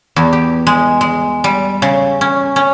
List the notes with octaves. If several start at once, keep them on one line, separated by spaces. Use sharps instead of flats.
E2
G4
G#3
G#3
G3
C#3
C#4
C#4